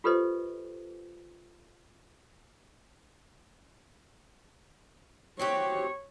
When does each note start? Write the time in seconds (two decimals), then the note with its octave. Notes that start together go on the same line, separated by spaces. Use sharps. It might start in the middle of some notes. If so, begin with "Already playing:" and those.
0.04 F4 G4 A4 B4 C5 D#5
5.39 C4 F#4 G4 C#5